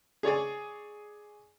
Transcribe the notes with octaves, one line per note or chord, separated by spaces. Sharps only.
G#4 C#5 D5 G#5